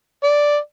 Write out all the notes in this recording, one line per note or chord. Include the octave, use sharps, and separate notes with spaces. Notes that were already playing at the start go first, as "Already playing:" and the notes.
D5